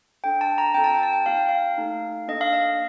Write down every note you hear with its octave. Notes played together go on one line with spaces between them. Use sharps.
D4 A4 G5
A5
A#5
C4 F4 A4 G5
A5
G5
A5
G5
A#3 D#4 G4 F5
G5
F5
A3 D#4 A4
A#3 D4 A4 D#5
F5
D#5